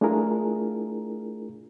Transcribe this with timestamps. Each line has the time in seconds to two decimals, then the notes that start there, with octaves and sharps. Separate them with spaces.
0.01 A3 D4 E4 F4 G#4 A#4